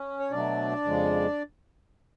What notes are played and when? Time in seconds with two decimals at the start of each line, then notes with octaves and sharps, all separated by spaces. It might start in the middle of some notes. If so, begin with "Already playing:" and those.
Already playing: C#4
0.20 C#5
0.31 B2 F#3 A3 D4 D5
0.84 F2 C#3 F3 G#3